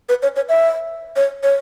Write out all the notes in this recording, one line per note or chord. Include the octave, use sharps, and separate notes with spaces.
B4
C#5
C#5
E5
C#5
C#5